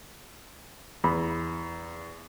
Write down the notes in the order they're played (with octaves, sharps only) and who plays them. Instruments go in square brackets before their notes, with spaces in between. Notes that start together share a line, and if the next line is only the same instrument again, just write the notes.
[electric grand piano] E2 [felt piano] B5